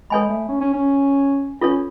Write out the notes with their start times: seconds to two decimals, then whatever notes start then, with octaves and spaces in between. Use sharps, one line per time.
0.10 G#3 A4 C#5 G#5 B5
0.29 A3
0.49 C#4
0.61 C#4
0.73 C#4
1.61 C#4 F4 A4 C#5